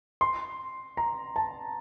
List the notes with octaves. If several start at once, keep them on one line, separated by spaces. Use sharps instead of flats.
C6
A#5
A5